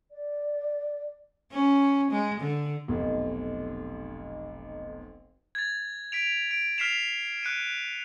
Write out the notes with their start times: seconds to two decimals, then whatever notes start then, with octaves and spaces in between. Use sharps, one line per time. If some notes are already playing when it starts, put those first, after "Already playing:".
0.11 D5
1.52 C#4
2.11 G#3
2.40 D3
2.88 F1 B1
5.55 G#6 A6
6.12 B6 D7 F7
6.51 D7
6.78 F6 B6 C7 E7 F7
7.43 F#6 C#7 D#7